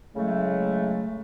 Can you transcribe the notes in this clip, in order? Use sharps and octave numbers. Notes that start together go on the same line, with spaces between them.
A2 C#3 F#3 G#3 A3